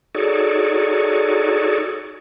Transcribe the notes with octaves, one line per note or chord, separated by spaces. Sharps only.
D#4 F#4 G#4 A4 C#5 D5